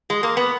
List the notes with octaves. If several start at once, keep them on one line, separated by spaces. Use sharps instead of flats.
G#3
A#3
B3